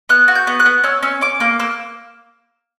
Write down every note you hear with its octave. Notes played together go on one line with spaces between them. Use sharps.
B3 F#6
F#4
G6
B3
F#6
B3
C#4 E6
C#4 E6
C#4 D6
A#3 D6
A#3 E6